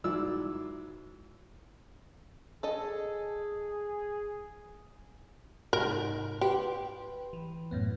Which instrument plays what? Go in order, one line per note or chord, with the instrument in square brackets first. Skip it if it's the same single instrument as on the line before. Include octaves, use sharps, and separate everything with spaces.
[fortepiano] G#2 F#3 E4 D5 E6
[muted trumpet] G#4 [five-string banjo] A4 D#5
[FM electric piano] G#2 C3 D#4 [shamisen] A#4
[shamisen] G4 [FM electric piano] B4 G5 C6
[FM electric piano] E3
F#2 A2 B3